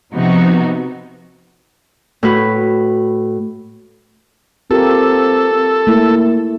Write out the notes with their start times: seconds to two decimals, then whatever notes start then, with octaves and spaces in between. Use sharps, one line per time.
0.13 C3 F3 B3 D#4 F#4
2.23 A2 F#4 B4
4.71 C4 F4 G4 A4 A#4
5.87 A3 A#3 E4